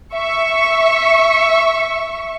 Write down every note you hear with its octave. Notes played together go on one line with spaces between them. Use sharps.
E5 C#6